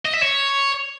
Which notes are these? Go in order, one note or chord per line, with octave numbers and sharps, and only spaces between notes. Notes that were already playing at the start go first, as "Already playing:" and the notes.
D#5
E5
C#5